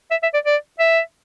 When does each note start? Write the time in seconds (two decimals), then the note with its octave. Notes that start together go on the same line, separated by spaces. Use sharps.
0.11 E5
0.23 E5
0.34 D5
0.46 D5
0.79 E5